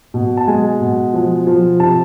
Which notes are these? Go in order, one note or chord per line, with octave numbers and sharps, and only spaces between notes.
B2
A5
G#3 G#5
B2
F3
F3
C3 A5